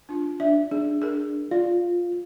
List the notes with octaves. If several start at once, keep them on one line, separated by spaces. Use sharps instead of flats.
D4 F4
D4 E5
D4 G#4
G#4 A#4
F4 D5